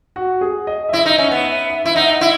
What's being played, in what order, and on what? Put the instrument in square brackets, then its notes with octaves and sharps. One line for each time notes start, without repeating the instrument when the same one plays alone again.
[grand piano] F#4
G#4
D#5
E5
[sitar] E4 [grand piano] D#5
[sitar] D#4
[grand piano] E5
[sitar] C#4
[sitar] B3 [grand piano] F#5
[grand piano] E5
E5
[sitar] E4 [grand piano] E5
[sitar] D#4 [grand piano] F#5
[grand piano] F#5
[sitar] E4 [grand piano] E5